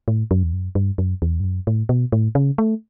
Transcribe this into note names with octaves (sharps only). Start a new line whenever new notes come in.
A2
F#2
E2
F#2
G2
F#2
E2
G2
F#2
A2
B2
A2
C#3
A3